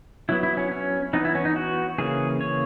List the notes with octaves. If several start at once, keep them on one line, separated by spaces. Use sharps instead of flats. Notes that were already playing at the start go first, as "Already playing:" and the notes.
F#3 B3 E4
E4
C#4
C#4
E3 B3 D#4
E4
C#4
D#4
F#4
C#3 E3 A#3 C#4 G#4
C#5